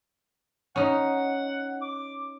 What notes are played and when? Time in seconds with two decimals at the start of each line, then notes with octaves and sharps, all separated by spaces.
0.76 C#4 D#4 F#5
1.81 D6